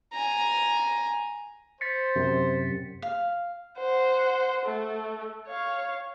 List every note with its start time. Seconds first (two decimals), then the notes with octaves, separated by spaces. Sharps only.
0.14 G#5 A#5
1.81 C5 A6 B6 C#7
2.16 F#2 C3
3.02 F5
3.78 C5 F#5
4.66 A3
5.47 C#5 F5